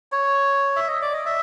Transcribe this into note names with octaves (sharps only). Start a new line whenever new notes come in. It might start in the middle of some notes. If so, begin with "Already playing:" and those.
C#5
E5
D#5
D5
D#5
E5